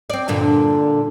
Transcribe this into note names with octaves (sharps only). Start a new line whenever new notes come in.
C4 D5
G2 A#2 D3